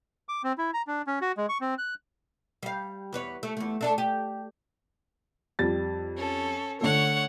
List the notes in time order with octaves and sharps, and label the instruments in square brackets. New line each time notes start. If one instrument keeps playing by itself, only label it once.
[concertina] D6
C4
E4
A#5
D4
C#4
F#4
G#3
C#6
C4
F#6
[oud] G3 F5
E2 B4 C#5
A3
E2 A3
A3 D4 A4
G4
[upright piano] F2 G3 A6
[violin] C#4 A4
[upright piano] D3 A3 A4 [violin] C#5 F#5